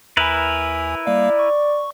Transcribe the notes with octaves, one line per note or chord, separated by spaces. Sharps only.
D#2 E4 A#4 B4 G#5
G3 A#3 D5 F5
C#6